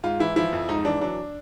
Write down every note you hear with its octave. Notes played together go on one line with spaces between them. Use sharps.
G#2 F4
E3 E4
F3 E4
F2
G#2 D#4
E3 D4
F#3 D4